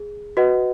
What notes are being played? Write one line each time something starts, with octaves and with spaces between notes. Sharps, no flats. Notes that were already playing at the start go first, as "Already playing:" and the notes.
Already playing: G#4
F#4 B4 D#5 F#5